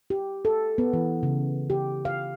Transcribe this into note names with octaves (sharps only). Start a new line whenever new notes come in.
G4
A4
B3
E3
C#3
G4
F5